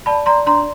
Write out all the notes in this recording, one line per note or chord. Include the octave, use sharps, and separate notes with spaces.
D5 A5 B5
D5 A#5 C6
D4 A#5 C6